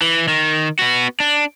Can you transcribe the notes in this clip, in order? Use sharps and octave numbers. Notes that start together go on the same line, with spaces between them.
E3
D#3
B3 F#4
D4